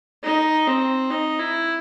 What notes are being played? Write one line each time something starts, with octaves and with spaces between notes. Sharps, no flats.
D#4
C4
D#4
E4